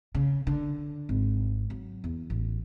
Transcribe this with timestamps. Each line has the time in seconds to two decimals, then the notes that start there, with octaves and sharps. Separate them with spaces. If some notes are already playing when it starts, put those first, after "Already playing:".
0.15 C#3
0.47 D3
1.09 G#1
1.70 F#3
2.04 E2
2.30 A1